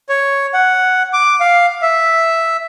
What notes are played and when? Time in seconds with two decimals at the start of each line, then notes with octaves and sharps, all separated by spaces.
0.09 C#5
0.54 F#5
1.13 D6
1.40 F5
1.82 E5